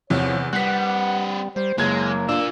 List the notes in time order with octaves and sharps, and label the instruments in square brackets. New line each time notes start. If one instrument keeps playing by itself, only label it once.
[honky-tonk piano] E2 C3 [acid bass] F3 [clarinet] C#5
[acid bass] G3 [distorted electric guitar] C4 B4 [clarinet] F#5 [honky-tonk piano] F#6 B6
[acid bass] G3 [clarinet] C5
[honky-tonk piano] F#1 G#6 [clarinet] F#3 [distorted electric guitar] G#3 [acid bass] A#3
[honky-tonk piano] D4 [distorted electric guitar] F4 A#4 [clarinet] E6